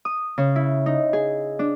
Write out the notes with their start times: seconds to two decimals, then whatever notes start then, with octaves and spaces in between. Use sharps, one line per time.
0.05 D#6
0.38 C#3
0.56 E4
0.86 D#4
1.13 G#4
1.59 D4